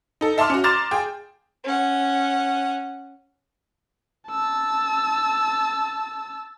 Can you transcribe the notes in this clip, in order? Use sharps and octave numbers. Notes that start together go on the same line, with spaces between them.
D#4 A4
E5 A5 C6 D6 F6
C#4 F#4
A#5 C6 D6 F6 A6 E7
G#4 G5
C#4 F#5
A5 E6